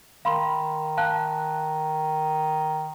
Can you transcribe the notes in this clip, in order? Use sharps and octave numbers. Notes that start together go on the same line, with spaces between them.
D#3 F5 B5 C6
F5 A5 F#6